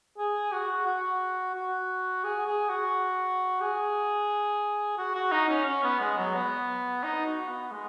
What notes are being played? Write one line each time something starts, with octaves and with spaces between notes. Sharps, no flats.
G#4
F#4
F#4
F#4
G#4
G#4
F#4
G#4
F#4
F#4
D#4
C#4
C#4
B3
G#3
F#3
B3
D#4
F#4
B3
G#3